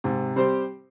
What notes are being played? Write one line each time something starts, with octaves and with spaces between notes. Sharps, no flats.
G#2 C3
G3 C4 G4 C5